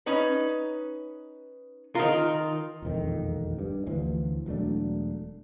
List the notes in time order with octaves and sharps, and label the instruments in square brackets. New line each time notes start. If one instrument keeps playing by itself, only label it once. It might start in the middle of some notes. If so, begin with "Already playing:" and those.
[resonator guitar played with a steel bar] C#4 D#4 B4
[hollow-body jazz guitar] D#3 F4 [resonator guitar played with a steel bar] A#4
[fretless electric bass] E1 A#1 F2 D#3
G2
D2 E3 F3
E1 F#3 A3 D4